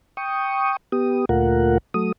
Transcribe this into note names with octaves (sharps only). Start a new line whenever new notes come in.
G5 C#6 D#6
B3 G4 D#6
D2 A#2 A3 F4 A#4 F#5
F#3 A3 D#6